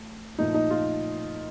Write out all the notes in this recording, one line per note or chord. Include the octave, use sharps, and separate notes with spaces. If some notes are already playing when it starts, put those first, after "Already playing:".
Already playing: A3
A#2 F3 A3 D#4
D#4
F4